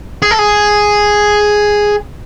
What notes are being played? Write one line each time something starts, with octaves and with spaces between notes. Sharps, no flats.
G#4
A4
G#4